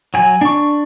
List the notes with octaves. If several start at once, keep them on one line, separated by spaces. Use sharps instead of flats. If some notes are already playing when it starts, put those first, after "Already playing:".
F#3 G#5
D4 C#6